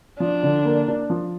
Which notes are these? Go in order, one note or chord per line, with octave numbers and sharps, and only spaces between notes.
F3 D4
D3
A#3
D4
F3